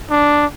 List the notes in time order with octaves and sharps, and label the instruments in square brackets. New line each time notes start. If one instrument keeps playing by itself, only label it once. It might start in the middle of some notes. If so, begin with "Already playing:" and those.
[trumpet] D4